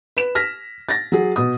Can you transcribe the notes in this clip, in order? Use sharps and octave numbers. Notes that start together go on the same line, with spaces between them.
B4 E7
F6 A#6 B6
A6 A#6
F#3 G#4
B2 D#6